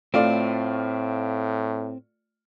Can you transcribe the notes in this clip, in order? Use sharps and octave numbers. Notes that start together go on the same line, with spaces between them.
A2 A3 C4 F4 D5